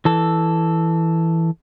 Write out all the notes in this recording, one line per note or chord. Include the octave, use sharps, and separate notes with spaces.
E3 A4